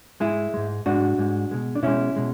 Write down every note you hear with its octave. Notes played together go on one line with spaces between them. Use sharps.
G#2 G#3 E4 G#4
G#2 G#3
G#2 G#3 D4 F#4
G#2 G#3
B2 G#3
D4
B2 G#3 C#4 E4
B2 G#3